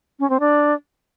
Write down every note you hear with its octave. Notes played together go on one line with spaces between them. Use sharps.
C#4
C4
D4